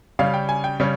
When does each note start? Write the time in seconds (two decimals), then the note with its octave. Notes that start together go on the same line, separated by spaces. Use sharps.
0.19 C#3 G3 C#4 F5
0.34 G5
0.49 G#5
0.64 G5
0.80 C#3 G3 C#4